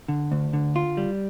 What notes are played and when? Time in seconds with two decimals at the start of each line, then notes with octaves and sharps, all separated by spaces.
0.08 D3
0.32 D2
0.53 D3
0.76 F4
0.97 G3